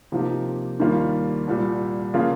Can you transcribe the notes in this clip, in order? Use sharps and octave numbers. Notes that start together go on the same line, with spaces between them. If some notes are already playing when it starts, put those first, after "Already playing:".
C3 F3 A#3 D#4 G4
D#2 D#3 G3 A#3 F4
C2 A#2 G3
C#3 F3 A#3 F4